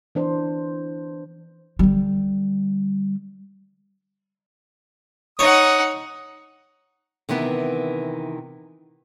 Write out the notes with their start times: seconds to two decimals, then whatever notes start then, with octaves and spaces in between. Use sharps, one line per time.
0.15 E3 D4 C5
1.79 D3 G3
5.39 D#4 C#5 F#5 D#6
7.29 C3 D#3 E3 B3